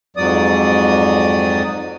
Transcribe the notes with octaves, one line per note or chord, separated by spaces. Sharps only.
F2 G#2 F#3 D5 D#6